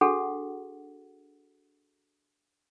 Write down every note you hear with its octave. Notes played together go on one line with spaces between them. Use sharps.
D4 F#4 G#4 A4 F#5